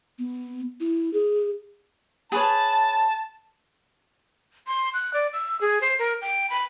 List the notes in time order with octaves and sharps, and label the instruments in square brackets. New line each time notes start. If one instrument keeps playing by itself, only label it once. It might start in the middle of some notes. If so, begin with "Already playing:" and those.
[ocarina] B3
E4
G#4
[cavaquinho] G#4 B4 C#5 [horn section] A5
[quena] C6
F#6
D5
E6
G#4
C5
A#4
G5
B5